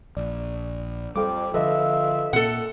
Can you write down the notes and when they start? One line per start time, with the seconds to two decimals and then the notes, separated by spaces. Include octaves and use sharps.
0.17 A#1 D5
1.16 F2 G3 G5 D6
1.54 D3 F3 F4 A4 B4 D#5 E5
2.33 A#2 A#3 A4 F#5